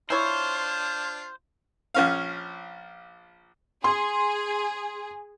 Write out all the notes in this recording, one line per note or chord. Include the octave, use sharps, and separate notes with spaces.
D4 E4 F4 C5 C#5
A#1 C#4 F5
G#4 C6